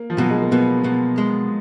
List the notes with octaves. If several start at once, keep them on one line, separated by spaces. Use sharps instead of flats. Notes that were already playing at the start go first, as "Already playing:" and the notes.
Already playing: A#3
F3
B2 F#3
G#3
A#3
B2 B3
B2
G#3